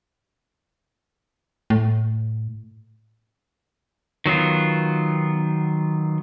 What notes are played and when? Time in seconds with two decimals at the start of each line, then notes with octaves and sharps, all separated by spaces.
1.70 A2
4.26 D#3 F#3 B3 F4